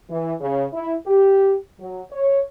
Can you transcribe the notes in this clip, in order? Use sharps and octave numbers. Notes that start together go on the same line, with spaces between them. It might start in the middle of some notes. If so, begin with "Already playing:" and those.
E3
C#3
E4
G4
F#3
C#5